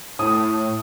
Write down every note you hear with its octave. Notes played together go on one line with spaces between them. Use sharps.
A2 D#6